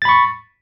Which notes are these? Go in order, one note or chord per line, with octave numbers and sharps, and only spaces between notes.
B5 C#6 A6